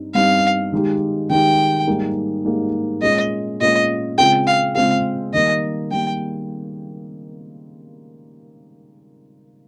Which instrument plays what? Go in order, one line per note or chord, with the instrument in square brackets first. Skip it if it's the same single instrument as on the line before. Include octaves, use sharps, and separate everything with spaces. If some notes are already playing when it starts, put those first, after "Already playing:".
Already playing: [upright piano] G2 G3 C4 D#4
[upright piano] G2 G3 C4 D#4 [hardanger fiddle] F5
[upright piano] D#3 G#3 D#4 G4
[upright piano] D#3 G#3 D#4 G4 [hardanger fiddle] G5
[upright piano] G#2 G3 A#3 D#4 G#4
G#2 G3 A#3 D#4 G#4
[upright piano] A#2 G#3 C#4 G#4 [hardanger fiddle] D#5
[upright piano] A#2 G#3 C#4 G#4 [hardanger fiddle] D#5
[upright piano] C#3 G#3 C4 F4 G#4 [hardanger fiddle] G5
[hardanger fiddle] F5
[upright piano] C#3 G#3 C4 F4 G#4 [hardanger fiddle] F5
[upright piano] D#3 G3 A#3 [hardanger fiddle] D#5
[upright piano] D#3 G3 A#3 [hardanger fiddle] G5